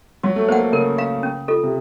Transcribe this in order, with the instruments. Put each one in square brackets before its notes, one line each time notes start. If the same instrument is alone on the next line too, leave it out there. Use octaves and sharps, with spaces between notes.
[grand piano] F#3 [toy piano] F#4
[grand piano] A3
[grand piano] A#3 [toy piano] C5 F#5
[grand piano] A3
[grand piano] C#3 [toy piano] A#4
[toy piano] F5 A#5
C#4
F4 A4
[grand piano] C3